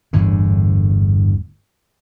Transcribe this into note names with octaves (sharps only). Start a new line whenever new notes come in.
G1 E2 A2 D3